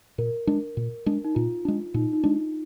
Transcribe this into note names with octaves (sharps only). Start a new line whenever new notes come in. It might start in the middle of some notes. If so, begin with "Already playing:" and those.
A#2 A#4
G#3 D4
A#2
G#3 D4
D#4
A#2 F4
G#3 D4
A#2 D#4
D#4
G#3 D4